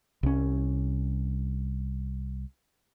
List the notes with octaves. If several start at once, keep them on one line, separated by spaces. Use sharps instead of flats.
C2 C#4